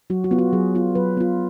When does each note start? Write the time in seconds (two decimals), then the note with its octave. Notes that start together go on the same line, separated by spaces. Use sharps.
0.10 F#3 F#4
0.24 F#4
0.31 B3 F4
0.39 F#4
0.53 F#3 G#4
0.75 B3 F4
0.95 F#3 B4
1.17 B3 F4